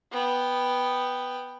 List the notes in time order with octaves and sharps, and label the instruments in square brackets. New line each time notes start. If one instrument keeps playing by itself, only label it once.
[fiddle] B3 G5